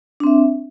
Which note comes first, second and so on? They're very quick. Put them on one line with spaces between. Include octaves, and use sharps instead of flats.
D4 C4 E5